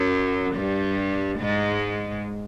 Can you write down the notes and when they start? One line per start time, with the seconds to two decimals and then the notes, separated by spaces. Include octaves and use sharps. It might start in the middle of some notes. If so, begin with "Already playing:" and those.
Already playing: F#2 F#3
0.55 G2 G3
1.39 G#2 G#3